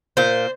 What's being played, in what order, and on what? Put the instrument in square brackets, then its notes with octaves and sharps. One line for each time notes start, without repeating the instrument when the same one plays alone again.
[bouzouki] A#2 C5